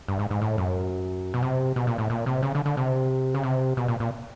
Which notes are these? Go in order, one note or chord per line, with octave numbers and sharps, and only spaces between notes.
G2
G#2
G#2
A2
F#2
B2
C3
B2
A#2
A2
A#2
C3
C#3
D3
D3
C3
C#3
C3
B2
A#2
A#2